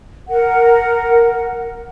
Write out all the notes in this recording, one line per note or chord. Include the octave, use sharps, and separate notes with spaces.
A#4 F#5